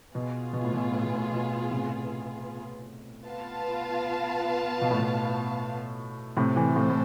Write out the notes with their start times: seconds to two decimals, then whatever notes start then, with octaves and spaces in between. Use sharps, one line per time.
0.14 B2 B3 F4 G#4
0.53 B2
0.64 A2
0.74 B2
0.92 A2
1.03 B2
1.14 A2
1.32 B2
1.71 A2 C3
3.26 B3 F4 B4 F5 A5
4.81 B2
4.91 A2
4.99 B2
6.37 A2 C3 F4 A4 C5
6.56 C3 E3
6.76 A2 C3
6.90 A2